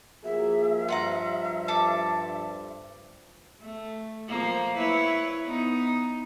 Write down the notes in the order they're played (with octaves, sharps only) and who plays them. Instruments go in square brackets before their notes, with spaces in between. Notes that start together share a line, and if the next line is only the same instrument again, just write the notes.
[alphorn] F3 [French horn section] A#3 F#4 G#4 [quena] E5
[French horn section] G2 [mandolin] F4 F#5 A#5
[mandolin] A4 A5 D6
[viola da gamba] A3
F3 A#3
E4 B4 C#5
B3 D#4